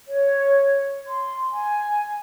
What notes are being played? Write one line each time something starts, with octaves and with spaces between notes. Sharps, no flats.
C#5
C6
G#5